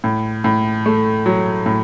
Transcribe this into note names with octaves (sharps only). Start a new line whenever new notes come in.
A2
A2
A3
F#3
A2